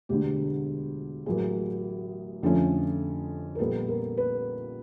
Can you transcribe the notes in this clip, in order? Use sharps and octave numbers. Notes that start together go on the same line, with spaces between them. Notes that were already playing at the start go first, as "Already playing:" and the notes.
E1 D2 D3 G4
A1 A2 F#3 A#3 G#4
F2 D3 F3 A3 C#4 A4
A#4
A#1 A#2 G3 B3 A4
A#4
B4